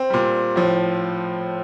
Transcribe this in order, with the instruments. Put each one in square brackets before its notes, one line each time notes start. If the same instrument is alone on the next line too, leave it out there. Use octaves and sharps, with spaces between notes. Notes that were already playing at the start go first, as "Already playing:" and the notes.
Already playing: [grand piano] C4
A#2 G3
A2 F3